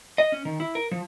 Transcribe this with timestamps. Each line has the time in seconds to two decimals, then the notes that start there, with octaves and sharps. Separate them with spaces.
0.18 D#5
0.32 C#4
0.45 D#3
0.60 E4
0.75 A#4
0.91 F3